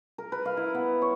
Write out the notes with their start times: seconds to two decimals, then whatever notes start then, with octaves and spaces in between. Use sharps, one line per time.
0.18 A#4
0.32 B4
0.45 F5
0.57 E4
0.75 B3
1.02 C#5